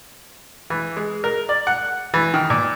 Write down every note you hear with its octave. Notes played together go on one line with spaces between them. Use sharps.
E3
G#3
A#4
D5
F#5
E3
D#3
A#2